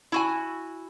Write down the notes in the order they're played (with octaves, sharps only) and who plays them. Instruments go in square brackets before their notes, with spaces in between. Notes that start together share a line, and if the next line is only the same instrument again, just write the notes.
[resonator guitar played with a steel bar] E4 F#4 G#5